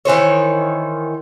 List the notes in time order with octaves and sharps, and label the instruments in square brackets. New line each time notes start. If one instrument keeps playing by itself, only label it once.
[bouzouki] D#3 E3 C5 C#5